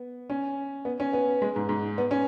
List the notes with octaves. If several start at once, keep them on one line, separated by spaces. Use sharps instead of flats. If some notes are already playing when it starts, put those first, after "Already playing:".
Already playing: B3
C#4
B3
C#4
B3
G#3
G#2
G#2
B3
C#4